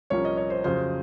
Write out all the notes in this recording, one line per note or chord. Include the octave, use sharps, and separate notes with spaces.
C2 A#2 F3 A#3 C#4 C#5
D#5
C#5
C5
F2 C#3 F#3 C5